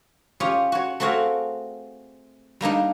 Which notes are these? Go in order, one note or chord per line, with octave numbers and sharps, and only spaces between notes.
C#4 F4 G4 G#4
F#4 C#5
A3 C4 F#4 G#4 F5
G3 A#3 D4 D#4